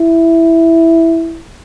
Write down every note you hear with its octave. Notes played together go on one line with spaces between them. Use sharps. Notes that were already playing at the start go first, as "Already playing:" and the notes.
Already playing: E4